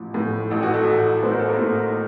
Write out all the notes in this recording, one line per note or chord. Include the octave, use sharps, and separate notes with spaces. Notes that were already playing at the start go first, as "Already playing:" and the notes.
Already playing: A1 F3
A2
A1 A4
F#4
A3 A4
A1
A2 C5
A#4
A4
A#3 A#4
A2